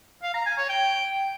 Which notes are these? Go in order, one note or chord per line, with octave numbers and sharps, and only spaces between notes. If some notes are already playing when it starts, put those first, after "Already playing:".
F5
A#5
G#5
C#5
G5